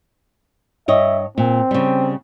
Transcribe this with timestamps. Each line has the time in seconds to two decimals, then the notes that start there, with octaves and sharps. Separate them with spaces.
0.88 G2 C#5 D#5 E5
1.38 A#2 C4
1.71 C#3 G3